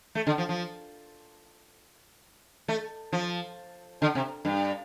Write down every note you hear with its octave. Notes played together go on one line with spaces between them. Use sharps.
A3
D3
F3
F3
A3
F3
D3
C3
G2